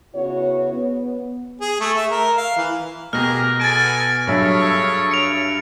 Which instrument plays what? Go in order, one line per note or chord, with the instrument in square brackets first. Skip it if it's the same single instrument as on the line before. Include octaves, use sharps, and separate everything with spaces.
[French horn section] C#3 B3 E4 F#4 C#5
B3
[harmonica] G#4
A3
E5
A#4
F5
E3
[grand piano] B2 [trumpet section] G4 G#4 A#4 [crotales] F6 A#6
[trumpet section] B3 A4 G#5 [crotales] A6 D7
[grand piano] G2 F#3 E5 [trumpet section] G#4 A4 C#5
[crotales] C#7 D7 F7